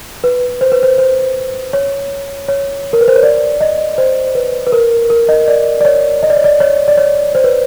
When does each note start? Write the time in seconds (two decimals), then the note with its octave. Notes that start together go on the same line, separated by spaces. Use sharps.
0.24 B4
0.61 C5
0.72 B4
0.83 C5
0.98 C5
1.73 C#5
2.48 C#5
2.93 A#4
3.01 B4
3.08 C5
3.16 C#5
3.23 D5
3.61 D#5
3.98 C5
4.35 B4
4.67 B4
4.72 A#4
5.10 A#4
5.29 D#5
5.48 D5
5.81 D5
5.85 C#5
6.23 D#5
6.30 D5
6.37 C#5
6.44 D5
6.60 C#5
6.88 D5
6.97 C#5
7.35 C5
7.44 B4